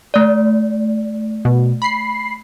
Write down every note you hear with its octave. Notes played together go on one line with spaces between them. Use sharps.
A3 D5
B2
B5 C7